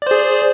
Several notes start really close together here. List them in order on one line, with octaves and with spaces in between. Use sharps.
D5 C5 G#4